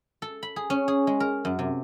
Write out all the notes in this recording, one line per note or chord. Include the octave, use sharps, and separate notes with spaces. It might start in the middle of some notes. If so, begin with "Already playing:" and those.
A4
B5
G#4
C#4
G#4
G#3
A#4
F#2
C3